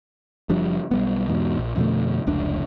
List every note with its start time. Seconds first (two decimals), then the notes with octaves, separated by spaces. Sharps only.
0.49 F#1 F3 G3 D4
0.91 B1 G3 B3
1.28 E2 G#2 B2
1.58 A#1
1.77 F2 B2 D3 A3
2.27 F1 C#2 D4